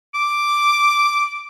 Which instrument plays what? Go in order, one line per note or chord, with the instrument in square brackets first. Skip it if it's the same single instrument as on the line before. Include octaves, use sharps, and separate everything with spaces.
[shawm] D6